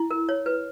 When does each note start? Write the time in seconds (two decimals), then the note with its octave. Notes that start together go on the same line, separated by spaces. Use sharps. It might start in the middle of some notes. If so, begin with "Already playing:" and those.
Already playing: E4
0.11 A#4
0.29 C#5
0.46 B4